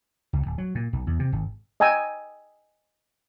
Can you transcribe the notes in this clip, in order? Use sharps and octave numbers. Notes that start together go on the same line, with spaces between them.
C#2
D1
F#3
A#2
B1
E2
C3
G#1
D#5 G5 G#5 A#5 E6